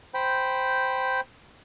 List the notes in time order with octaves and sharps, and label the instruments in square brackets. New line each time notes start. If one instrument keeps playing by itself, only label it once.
[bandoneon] C5 G5 B5